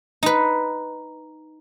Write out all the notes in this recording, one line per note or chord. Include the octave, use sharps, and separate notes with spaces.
D#4 B4